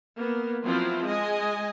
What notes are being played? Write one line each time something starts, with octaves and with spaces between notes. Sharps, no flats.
A#3 B3
F3 F#3 C4 E4 F4
G#3 D#5 G#5